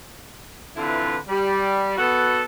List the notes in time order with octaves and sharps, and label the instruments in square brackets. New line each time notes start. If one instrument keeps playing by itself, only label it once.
[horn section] D3 E3 C4 E4 F4 B4
G3
B3 F#4 A4